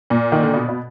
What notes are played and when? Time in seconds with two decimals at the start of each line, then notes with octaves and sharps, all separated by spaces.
0.10 A#2
0.32 D#3
0.42 D3
0.54 B2
0.68 B2